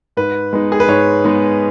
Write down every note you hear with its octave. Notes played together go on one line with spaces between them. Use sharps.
G#2 B4
G#3 B3 D#4
G#4
B4
G#2 C#5
G#3 B3 D#4